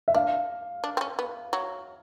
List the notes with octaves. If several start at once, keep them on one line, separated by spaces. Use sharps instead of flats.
E5
D4 F5
D4
C4
C#4
B3
F#3